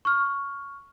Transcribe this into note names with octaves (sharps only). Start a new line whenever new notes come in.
C#6 F6